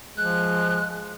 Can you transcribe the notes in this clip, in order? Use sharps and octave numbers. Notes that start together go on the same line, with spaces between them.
F3 G#3 F#6